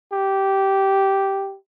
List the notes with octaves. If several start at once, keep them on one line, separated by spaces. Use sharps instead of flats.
G4